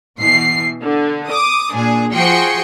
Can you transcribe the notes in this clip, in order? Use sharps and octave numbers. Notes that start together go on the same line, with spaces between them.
B2 E3 C7
D3
D6 D#6
A#2 D4 G#4
F3 F#4 G#4 G5 C6 C#7